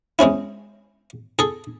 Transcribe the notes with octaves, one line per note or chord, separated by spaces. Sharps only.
G#3 C4 C#4 E4
G#4 A4